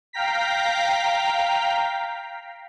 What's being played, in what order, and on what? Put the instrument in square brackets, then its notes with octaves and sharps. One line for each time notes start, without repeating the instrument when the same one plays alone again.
[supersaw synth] F5 G5 A#5 B6